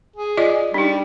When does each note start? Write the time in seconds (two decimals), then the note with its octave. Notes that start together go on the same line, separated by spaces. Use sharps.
0.16 G#4
0.37 F4 D5 D#5
0.74 G3 D4 D#4